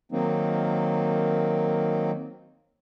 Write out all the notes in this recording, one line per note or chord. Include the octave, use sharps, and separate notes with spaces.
D#3 F#3 A#3 C4 D#4